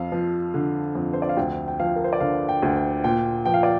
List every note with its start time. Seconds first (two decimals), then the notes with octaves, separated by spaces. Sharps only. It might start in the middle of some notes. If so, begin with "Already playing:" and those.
Already playing: F2 F5
0.12 F3
0.54 D3
0.95 F2
1.13 C5
1.22 D5
1.29 F5
1.37 D2 G5
1.68 G5
1.80 F3 F5
1.96 A#4
2.04 C5
2.13 D5
2.20 D3 F5
2.49 G5
2.63 D2
2.76 G5
3.04 A#2 G5
3.45 F3 G5
3.54 F5
3.63 D5